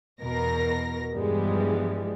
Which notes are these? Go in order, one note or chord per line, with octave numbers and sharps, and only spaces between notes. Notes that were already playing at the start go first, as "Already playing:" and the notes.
E2 B2 A#4 A#6
G2 E3 F3 G3 G#3 B3